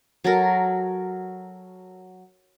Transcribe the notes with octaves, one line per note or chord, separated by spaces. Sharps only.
F#3 A4 A#4